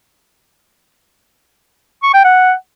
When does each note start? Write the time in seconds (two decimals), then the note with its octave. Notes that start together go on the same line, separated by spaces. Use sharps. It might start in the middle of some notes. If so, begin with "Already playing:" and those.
2.03 C#6
2.14 G5
2.25 F#5